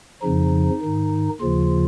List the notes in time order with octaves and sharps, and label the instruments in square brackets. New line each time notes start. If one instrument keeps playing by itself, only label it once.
[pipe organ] F2 C#3 F3 D#4
G#2 D#3
D#2 C#3 F3 F4